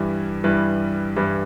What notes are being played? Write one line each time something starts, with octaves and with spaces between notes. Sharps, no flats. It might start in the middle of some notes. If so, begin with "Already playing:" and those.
Already playing: G2 E3 G3 E4 B4
G2 E3 G3 E4 B4
G2 E3 G3 E4 B4